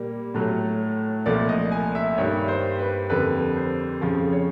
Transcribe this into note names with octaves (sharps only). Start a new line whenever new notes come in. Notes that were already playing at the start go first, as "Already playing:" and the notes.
Already playing: A#2 G3 A#3
A2 F#3 A3
C2 A#2 F3 A3 D5
D#5
G#5
E5
G2 D#3 G3 A#3 C#5
C5
B4
F2 D3 G3 A#3 B4
C5
F2 C#3 F3
C#5